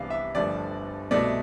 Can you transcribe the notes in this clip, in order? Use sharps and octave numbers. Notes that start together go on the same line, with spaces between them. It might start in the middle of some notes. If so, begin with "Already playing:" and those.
Already playing: C2 C3 E3 B3 D4 F5
E5
G1 G2 F3 A3 D5
C2 B2 A3 D5